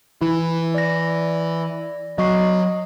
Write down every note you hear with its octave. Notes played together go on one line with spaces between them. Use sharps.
E3 E4
D5 A#6
F#3 D#5 C#6 C7